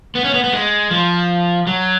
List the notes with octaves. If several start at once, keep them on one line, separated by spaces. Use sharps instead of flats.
B3
C#4
B3
B3
G#3
F3
F#3